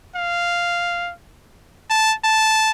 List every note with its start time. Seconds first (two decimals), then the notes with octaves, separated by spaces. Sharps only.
0.16 F5
1.90 A5
2.24 A5